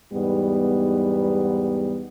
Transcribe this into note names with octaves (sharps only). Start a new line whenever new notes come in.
E2 G#2 G3 B3